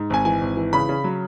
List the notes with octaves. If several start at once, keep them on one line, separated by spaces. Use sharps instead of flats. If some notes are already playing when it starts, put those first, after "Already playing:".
Already playing: G#2
G#1 G#5
E3 G#5
G#1
E3
C#3 B5
C#3
F#3